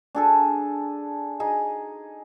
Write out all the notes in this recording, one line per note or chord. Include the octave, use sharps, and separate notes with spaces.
D4 G#4 A4
D#4 G#4